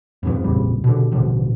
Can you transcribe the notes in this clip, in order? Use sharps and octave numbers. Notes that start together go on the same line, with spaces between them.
F2 G#2 F3
A#1 F2 C#3 G3
B2 D3
A1 B2 D3 F3